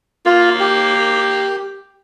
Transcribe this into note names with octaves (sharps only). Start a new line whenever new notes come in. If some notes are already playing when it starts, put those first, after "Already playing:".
A#3 F4
G4